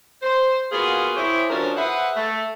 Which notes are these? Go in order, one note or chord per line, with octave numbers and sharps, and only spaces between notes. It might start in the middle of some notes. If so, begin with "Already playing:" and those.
C5
A#3 B3 F4 F#4 G#4
C4 E4 G4 G#4 C5 C#5
F3 F#3 A3 C#4 D4 A#4
G#4 B4 C5 E5 F#5
A3